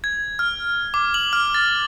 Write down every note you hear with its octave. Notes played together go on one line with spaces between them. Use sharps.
G#6
F6
D6
F#7
F6
A6